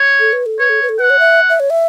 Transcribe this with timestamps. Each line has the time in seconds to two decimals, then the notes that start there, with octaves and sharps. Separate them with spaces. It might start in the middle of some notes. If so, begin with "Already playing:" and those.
Already playing: C#5
0.20 A4
0.33 B4
0.46 A4
0.59 B4 C#5
0.69 A4
0.82 B4
0.89 A4
0.99 B4 F#5
1.10 C#5
1.19 E5
1.49 E5
1.60 C#5
1.70 E5